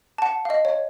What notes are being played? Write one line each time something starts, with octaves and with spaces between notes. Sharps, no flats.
A5
F#5
F5
D#5
C#5